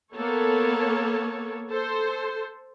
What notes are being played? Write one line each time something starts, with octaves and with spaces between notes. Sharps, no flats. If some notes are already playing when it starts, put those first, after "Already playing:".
A#3 B3 A4 C#5
A4 C5